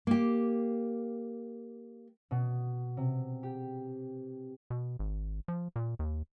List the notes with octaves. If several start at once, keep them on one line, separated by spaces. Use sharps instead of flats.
A#3 G4
B2
C3
G4
B2
G#1
F3
A#2
D#2